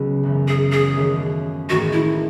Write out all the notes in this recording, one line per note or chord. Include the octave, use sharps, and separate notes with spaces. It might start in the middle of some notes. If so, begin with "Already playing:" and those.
Already playing: C#2 C#3 F#3 B3
G#1 F#2 C#3 E3
G#4
G#4
D#2 D#3 A3 C#4
A1 G#2 D#3 A3 F#4
E4